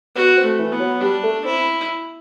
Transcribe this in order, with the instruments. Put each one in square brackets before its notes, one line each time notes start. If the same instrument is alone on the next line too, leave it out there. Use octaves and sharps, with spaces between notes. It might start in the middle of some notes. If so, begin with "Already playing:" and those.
[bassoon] B3 [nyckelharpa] F#4
[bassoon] C4
[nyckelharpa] A3
[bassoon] E3
[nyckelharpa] B3
[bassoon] F#3
[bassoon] G3 [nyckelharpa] D4
[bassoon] A3
[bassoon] C4 [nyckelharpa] E4